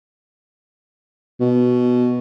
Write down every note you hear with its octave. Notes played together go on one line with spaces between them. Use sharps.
B2